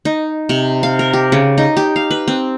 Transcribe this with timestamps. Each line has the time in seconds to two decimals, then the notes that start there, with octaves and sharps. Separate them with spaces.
0.05 D#4
0.49 C3
0.83 F5
0.99 A#4
1.13 G4
1.32 C#3
1.58 D#4
1.77 G4
1.96 F5
2.11 B4
2.28 C4